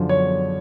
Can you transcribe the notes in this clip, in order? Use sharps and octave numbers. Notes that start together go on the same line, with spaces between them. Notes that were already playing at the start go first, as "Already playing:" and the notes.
Already playing: F#2 D3 F3
C#5